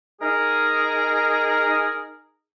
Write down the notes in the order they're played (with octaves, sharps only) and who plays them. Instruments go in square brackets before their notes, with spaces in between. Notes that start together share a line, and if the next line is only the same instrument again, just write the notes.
[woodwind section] D#4 G#4 A#4